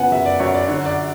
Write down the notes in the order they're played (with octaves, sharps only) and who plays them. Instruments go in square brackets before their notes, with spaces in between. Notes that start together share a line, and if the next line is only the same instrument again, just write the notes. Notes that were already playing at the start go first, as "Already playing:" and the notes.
Already playing: [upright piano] C#3 B3 F#5 G#5
F#2 E5
D5
F#2 C#5
D5
D3 C#5
D5